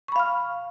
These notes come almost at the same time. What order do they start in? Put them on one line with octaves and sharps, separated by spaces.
C#6 B5 F5 F6